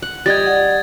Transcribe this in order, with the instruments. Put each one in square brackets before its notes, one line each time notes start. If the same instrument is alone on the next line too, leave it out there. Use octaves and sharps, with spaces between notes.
[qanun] F#5
[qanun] G3 D#5 G5 [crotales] G#6 A6
[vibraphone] D5 F#5